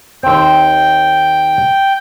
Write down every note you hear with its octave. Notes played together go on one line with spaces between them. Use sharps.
D#2 C4 G5